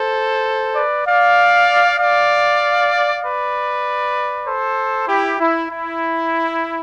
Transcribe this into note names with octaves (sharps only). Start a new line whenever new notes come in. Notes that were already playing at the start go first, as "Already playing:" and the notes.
Already playing: A4 C5
B4 D5
D5 F5
D5 F5
B4 D5
A4 C5
E4 G4
E4
E4